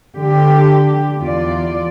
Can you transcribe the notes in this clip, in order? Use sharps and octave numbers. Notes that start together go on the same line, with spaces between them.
D3 G4
E2 F4 D5